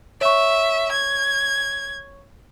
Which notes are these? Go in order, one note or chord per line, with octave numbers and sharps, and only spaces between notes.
C#5 E5 C#6
G#6